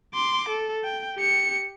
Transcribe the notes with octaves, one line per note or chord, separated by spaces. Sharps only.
C6 D6
A4
G5
G4 C#7